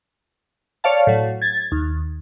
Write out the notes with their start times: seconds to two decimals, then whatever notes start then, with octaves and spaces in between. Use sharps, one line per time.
0.84 C#5 D5 F5 A5
1.07 A2 F#3
1.42 G#6 A6
1.72 D#2